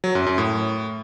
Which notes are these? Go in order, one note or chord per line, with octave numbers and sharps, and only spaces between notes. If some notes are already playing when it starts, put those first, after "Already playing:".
F#3
F#2
F#2
A2